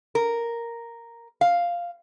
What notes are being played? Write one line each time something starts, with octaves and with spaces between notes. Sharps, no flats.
A#4
F5